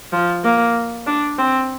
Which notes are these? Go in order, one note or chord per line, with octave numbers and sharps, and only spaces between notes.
F3
A#3
D4
C4